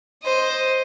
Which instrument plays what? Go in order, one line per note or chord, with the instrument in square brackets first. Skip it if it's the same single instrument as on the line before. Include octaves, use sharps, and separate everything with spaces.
[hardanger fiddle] C5 D#5